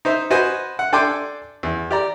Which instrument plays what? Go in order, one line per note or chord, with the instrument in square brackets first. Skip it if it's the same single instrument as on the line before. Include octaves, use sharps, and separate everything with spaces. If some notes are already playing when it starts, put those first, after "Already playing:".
[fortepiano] D#4 C5 E5
F#4 B4 C5 D#5 G#5
F#5
D4 A4 G5 G#5 C6 D6
E2
G4 D5 A#5